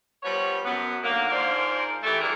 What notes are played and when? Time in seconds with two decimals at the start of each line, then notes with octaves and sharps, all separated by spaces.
0.23 F3 G3 B3 C#5
0.64 F#2 B3
1.03 D3 D#3 F#3 A#3
1.30 G#2 D4 F4 A#4 C5 D5
2.03 E3 A3 G4
2.21 D#3 F#3 D4 E4 G#4 A#4